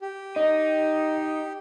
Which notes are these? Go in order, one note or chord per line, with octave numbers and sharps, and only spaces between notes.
G4
D#4 D#5